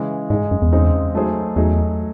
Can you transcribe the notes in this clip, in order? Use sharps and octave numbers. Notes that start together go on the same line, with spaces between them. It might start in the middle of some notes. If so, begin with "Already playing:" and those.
Already playing: C#3 E3 G#3
G#2 G#3 D#4 G#4
F#2
E2
C#3 G#3 C4 D#4
F#3 A3 D#4 G#4 C5
E2 F#3 A3 D#4 G#4